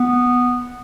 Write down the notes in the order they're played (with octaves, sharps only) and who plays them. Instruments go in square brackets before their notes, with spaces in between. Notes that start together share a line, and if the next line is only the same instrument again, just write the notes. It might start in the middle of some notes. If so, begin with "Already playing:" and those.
Already playing: [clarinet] B3